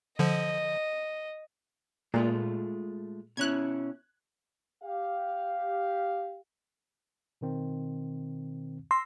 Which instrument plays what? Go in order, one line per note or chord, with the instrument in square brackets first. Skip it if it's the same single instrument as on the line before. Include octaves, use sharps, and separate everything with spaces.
[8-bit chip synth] D3 F3 [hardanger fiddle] D#5
[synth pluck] A#2 [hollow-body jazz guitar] G#3 A3 F4
[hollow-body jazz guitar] B2 C#4 E4 [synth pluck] F#6 G#6
[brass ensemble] G4 F5
[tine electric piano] B2 D#3 C4
[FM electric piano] C6 [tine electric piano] E6 A#6